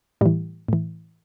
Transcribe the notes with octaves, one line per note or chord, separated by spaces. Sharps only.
A2 E3 G3
A2 E3